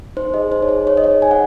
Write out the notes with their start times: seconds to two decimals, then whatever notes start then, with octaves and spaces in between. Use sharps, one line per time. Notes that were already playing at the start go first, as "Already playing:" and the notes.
0.17 D#4 C5
0.34 G#4 D#5
0.51 D#4 C5
0.62 C#5
0.69 G#4 C5
0.86 D#4 C#5
0.97 D#5
1.04 G#4 C#5
1.22 D#4 G#5
1.31 F#5